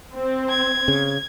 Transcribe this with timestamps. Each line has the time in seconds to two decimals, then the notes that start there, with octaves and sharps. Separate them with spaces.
0.14 C4
0.50 G#6
0.88 C#3